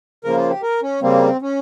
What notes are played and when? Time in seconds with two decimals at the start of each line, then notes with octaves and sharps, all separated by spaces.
0.24 C#3 F3 A#3 A#4
0.37 F4
0.50 G4
0.63 A#4
0.82 C#4
1.02 C#3 G3 A#3 C4
1.42 C#4